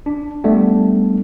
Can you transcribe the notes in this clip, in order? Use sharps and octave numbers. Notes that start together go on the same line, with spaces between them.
D4
G3 A3 B3 D4